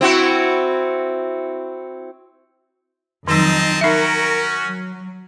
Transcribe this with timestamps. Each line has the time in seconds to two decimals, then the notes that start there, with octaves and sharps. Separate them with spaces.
0.01 C4 E4 F#4
3.28 F2 D#3 F#3 C4 D#4 D#5 A5
3.81 C#4 D#4 F#4 A#4 E5
4.63 F#3